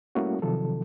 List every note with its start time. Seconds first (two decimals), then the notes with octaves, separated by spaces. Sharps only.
0.15 G3 A3 A#3 C#4 E4 F#4
0.42 C3 D#3 F3 F#3 A4